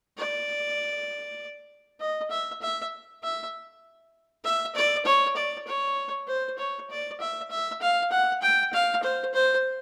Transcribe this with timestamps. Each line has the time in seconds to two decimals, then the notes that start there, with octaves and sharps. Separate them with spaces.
0.18 D5
2.00 D#5
2.31 E5
2.62 E5
3.23 E5
4.44 E5
4.75 D5
5.05 C#5
5.36 D5
5.67 C#5
6.28 C5
6.58 C#5
6.90 D5
7.20 E5
7.51 E5
7.81 F5
8.11 F#5
8.42 G5
8.73 F5
9.03 C5
9.34 C5